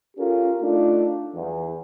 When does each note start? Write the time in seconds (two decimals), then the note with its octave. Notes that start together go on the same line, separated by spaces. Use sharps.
0.17 C#4 F4 G4 A4 A#4
0.60 A3 D4 D#4 F4
1.34 E2